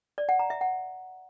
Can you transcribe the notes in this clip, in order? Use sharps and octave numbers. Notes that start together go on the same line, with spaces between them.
D5
F#5
A#5
E5
F#5